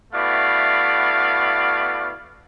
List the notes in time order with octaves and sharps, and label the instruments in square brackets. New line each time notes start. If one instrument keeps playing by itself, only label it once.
[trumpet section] A3 B3 E4 F#4 D5 F5